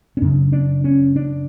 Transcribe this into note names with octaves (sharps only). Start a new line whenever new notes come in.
C#4
F#2 C#3 D4
D4
C#4
D4